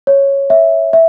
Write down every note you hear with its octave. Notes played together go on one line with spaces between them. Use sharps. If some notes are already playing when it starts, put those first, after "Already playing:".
C#5
E5
E5